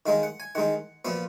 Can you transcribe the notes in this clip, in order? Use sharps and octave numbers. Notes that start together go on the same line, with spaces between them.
D#3 G#3 D#4 F5
F#5
G#5
D#3 G#3 D#4 F#5
A#2 F3 B3 F5